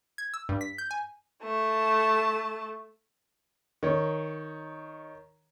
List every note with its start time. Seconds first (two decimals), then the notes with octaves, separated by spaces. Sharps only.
0.18 G#6
0.34 E6
0.49 G2
0.61 B6
0.78 G6
0.91 G#5
1.43 A3 A5
3.83 D#3 C#5